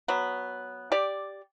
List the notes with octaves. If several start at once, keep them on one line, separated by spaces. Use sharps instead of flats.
F#3 B3
G4 D5